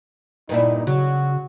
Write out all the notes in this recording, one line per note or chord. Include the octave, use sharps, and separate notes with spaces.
G2 A#2 D#4 E4
C#3 F#3 F#4